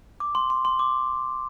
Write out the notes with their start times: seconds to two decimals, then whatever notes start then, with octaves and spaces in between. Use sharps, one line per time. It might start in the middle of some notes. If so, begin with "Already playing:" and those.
0.20 D6
0.35 C6
0.50 C6
0.65 C6
0.79 D6